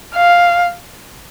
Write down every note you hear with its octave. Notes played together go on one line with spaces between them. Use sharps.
F5